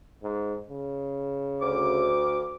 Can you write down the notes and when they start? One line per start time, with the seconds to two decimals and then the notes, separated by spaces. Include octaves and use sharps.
0.23 G#2
0.70 C#3
1.61 D2 D6